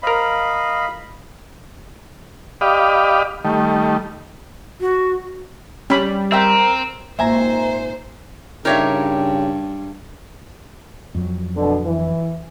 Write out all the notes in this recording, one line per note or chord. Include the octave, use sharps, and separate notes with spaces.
A#4 C5 D#5 F5 B5
G4 D5 D#5 F5 B5
D#3 G3 A3
F#4
G3 C#4 B5
C4 A#4 E5 G5
G#1 A#2 C5 E5 G#5 A#5
G2 C#3 D#4 F4 G4 A#4 C#5 E5
F2 F#3
B2 D3
E3